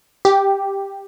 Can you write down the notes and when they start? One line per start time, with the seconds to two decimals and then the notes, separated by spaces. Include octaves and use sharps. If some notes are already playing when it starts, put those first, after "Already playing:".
0.25 G4